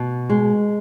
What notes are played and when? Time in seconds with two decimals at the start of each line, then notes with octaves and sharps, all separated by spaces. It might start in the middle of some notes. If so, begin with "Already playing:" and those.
Already playing: B2
0.30 G#3